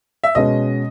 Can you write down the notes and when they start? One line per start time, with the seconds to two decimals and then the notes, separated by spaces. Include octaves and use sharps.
0.24 E5
0.35 B2 G#3 C#4 D#5